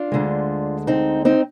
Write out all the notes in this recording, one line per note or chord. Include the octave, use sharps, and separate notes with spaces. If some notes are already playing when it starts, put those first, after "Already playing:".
Already playing: D4 F4
D2 D3 G#3
C4 D#4
C4 D#4